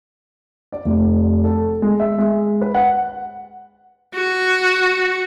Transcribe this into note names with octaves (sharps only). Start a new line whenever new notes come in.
D5
F1
A4
G#3
E5
G#3
B4
F#5
F#4